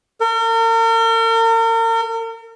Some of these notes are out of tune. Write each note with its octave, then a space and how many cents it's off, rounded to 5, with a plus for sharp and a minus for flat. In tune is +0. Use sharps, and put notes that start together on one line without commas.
A#4 -40